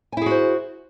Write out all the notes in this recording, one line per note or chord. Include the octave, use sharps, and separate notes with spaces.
E4 F#4 G#4 C5 G#5